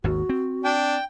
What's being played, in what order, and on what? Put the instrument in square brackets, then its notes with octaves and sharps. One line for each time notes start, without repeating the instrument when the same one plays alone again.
[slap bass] G#1 D#2 [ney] F#4
[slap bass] C4
[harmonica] D4 [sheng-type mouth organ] G5